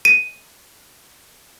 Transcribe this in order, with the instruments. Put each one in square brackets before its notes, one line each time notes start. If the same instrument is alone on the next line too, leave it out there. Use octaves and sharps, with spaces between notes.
[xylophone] D#7